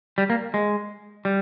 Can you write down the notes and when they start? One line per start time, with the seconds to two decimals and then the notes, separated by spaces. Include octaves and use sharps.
0.18 G3
0.30 A#3
0.54 G#3
1.25 G3